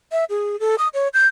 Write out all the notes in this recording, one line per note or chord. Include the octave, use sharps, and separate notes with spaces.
E5
G#4
A4
D#6
C#5
G6